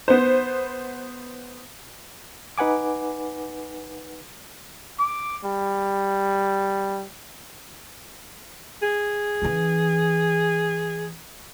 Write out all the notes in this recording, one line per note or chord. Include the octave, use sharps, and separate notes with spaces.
B3 C5
D#4 B4 F#5 G#5 D6
D6
G3
G#4
E3 C#4